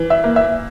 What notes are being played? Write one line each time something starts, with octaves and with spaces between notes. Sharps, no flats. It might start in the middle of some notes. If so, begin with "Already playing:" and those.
Already playing: E3
E5
A#3
E5